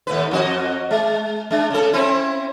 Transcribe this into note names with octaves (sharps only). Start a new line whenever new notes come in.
D#2 A2 B4
F2 F#4 D#5
G#3
G#3 D4
C#3 A4
C4 C#4 E4